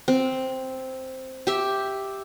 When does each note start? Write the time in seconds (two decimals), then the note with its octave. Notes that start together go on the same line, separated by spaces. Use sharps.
0.08 C4
1.47 G4 E5